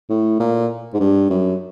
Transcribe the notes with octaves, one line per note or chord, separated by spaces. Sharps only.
A2
A#2
G#2
G2
F#2